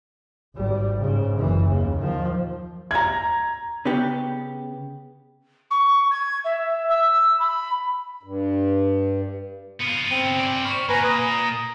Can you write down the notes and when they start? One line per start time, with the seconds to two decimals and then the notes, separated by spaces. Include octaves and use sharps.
0.56 G#1 G3
1.00 G#2 C#3
1.36 F#1 E3
1.68 D#2 C#3
1.98 D#3 F3
2.91 A#5 G#6
3.85 C#3 B3 G4
5.71 C#6
6.11 G#6
6.45 E5
6.90 E6
7.40 B5
8.23 G2
9.80 B3 F4
10.11 C4
10.40 D5 G#5
10.65 B5 C#6 F6
10.89 A#2 B4 G#5 A#5
11.04 A#5 D#6